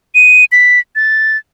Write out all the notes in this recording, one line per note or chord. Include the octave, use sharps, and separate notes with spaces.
D#7
B6
A6